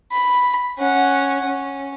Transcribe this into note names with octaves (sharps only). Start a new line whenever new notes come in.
B5
C#4 F#5
C#4